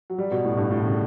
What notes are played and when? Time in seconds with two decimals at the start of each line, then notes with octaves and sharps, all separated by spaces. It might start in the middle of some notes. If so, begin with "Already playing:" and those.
0.10 F#3
0.18 G3
0.31 B2
0.45 A2
0.57 G2
0.71 A2
0.85 C#3